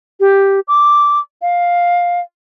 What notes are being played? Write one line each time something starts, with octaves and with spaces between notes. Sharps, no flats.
G4
D6
F5